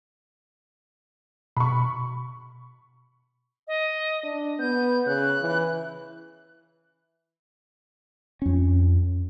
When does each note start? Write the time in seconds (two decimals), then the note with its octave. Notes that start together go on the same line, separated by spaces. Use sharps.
1.57 B2 B5 C#6
3.67 D#5
4.24 D4
4.59 B3 G6
5.06 C#3 F#6
5.41 E3
8.42 F2 C#4